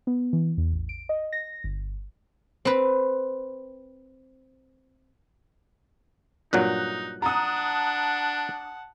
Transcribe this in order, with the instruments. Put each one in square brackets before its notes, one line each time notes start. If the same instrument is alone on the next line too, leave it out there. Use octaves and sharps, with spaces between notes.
[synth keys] B3
E3
E2
A1
D7
D#5
A#6
G1
[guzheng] C4 B4
[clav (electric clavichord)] G2 A#2 F#3 [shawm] D#4 [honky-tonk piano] F#6
[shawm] D4 [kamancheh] F#5 A5 [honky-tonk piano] A#5 D#6